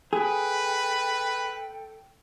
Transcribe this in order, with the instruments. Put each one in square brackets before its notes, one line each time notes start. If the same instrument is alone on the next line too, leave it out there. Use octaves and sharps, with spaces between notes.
[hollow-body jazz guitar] G#4 [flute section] A4 G5 [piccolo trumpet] B4